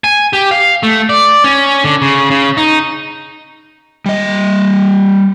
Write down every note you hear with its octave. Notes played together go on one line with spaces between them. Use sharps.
G#5
G4
F5
A3
D5
C#4
D3
C#3
C#3
D#4
G3 D#5